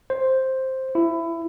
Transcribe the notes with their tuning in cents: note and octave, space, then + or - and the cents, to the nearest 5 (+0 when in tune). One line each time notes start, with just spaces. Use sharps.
C5 +5
E4 +20